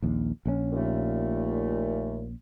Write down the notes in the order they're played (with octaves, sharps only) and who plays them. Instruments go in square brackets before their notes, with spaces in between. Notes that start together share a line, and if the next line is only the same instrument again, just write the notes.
[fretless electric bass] A#1 D#2
A#1 C#3 C#4
[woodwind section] D#2 A#2 A3